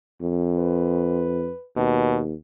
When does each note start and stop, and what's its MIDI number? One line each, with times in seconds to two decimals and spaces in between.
0.22 1.50 41
0.57 1.66 71
1.76 2.33 39
1.76 2.19 47